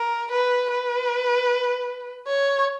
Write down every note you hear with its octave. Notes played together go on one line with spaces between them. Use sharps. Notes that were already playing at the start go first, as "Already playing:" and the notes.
Already playing: A#4
B4
B4
C#5